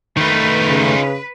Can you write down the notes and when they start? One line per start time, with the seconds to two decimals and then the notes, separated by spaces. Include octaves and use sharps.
0.17 D#3 A3 D#4 F4 B4
0.67 C#3